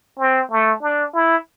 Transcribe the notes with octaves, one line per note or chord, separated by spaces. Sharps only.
C4
A3
D4
E4